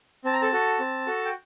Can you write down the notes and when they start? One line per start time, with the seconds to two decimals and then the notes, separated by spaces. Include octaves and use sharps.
0.25 C4 A5
0.33 A#5
0.42 A4 A5
0.52 F#4 A4
0.80 C4
1.07 F#4 A4
1.25 G5